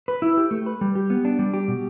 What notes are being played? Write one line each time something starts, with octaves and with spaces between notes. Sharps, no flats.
B4
E4
G4
A3
B4
G3
G4
B3
D4
G3
G4
B2